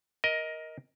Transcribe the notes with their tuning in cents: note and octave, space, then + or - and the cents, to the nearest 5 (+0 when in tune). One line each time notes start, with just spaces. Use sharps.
A#4 +10 D#5 +15